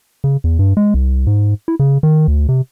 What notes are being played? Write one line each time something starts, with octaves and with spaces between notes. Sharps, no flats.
C#3
E2
G2
G#3
C2
G#2
E4
C#3
D#3
D2
C3